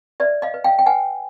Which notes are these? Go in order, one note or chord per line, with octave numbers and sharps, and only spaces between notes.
B4 D5 E5
D#5 F5
B4
F5 G5
G5
B4 F#5 G#5